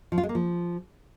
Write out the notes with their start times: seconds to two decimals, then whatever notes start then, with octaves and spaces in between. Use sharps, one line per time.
0.12 F3
0.18 F4
0.23 G#3
0.29 A#3
0.35 F3